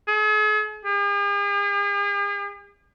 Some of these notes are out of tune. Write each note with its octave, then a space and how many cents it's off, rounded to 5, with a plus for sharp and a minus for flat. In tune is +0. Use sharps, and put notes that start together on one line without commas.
G#4 +45
G#4 -45